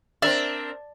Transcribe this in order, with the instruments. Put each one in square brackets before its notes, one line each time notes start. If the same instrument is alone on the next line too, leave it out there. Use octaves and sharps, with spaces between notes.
[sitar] C4 A#4 E5 [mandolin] D4